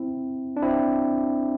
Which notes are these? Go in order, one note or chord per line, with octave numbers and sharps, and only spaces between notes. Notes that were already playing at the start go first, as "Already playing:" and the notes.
Already playing: C4 E4
D4
C4 E4